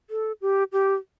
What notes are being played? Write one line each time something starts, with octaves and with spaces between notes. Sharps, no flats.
A4
G4
G4